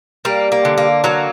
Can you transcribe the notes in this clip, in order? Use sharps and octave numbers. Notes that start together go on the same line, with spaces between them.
G3 A#3
A#3
D3
A#3
F#3 A#3